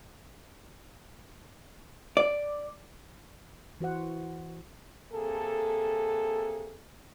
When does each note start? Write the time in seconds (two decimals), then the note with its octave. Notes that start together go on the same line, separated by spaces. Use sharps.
2.17 D5
3.80 E3 F#4 C5 F#5
5.13 C3 A#3 G#4 A4